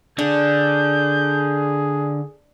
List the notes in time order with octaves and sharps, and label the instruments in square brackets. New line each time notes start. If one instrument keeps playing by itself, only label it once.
[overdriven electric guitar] D3 [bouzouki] D4 [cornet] G#4 [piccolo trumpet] G6